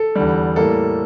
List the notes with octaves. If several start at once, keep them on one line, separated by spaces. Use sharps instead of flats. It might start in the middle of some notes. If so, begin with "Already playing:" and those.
Already playing: A4
E2 D3 G3
A2 G3 A#3 A4